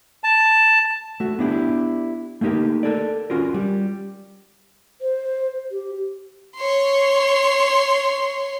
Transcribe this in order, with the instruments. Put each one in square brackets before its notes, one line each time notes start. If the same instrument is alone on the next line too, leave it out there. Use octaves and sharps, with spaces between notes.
[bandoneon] A5
[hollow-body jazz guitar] A3 F#4
B3 D4 E4 G4
A3 A#3 D#4 G4 A#4
A4 A#4 D5
C#4 F4 F#4 A#4
G3
[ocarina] C5
G4
[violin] C#5 C6